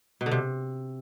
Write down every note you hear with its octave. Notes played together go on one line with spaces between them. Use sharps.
B2
D3
C3